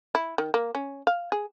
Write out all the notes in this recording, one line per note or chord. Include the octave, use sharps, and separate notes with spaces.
E4
D#3
A#3
C#4
F5
G#4